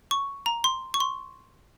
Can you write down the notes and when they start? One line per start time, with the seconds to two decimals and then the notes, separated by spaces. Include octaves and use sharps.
0.11 C#6
0.46 A#5
0.64 C6
0.94 C#6
1.00 C6